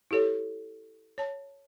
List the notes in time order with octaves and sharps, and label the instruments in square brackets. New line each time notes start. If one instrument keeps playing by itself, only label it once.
[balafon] E4 G4 A4 C#5
C#5 A5